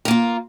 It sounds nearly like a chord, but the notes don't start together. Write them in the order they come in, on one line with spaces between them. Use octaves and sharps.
A#4 A#3 F4